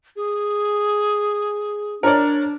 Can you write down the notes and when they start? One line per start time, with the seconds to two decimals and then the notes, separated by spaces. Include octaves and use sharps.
0.16 G#4
2.03 D4 A#4 C#5 D5